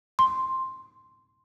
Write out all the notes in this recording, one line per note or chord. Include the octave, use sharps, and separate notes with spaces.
C6